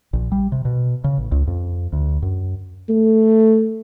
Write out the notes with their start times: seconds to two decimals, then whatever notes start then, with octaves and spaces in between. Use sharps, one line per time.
0.13 A#1
0.32 G3
0.52 C3
0.65 B2
1.04 C#3
1.18 A1
1.32 C#2
1.47 F2
1.92 D2
2.22 F#2
2.89 A3